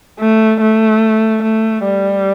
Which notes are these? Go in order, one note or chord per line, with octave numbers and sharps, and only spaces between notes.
A3
A3
A3
G3